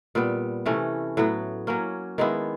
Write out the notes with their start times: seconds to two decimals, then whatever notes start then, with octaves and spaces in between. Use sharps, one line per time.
0.15 A#2 G3 B3
0.66 C3 E3 A3 C#4
1.17 A2 F#3 B3
1.67 F#3 A#3 C#4
2.18 D#3 G#3 B3 E4